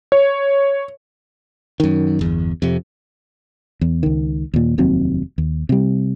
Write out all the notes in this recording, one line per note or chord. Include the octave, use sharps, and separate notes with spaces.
C#5
F#2 D#3
G1 E2
F2 C3
E2
C#2 D#3
D#2 A#2
F1 D#2 F#3 C4
D#2
C3 G3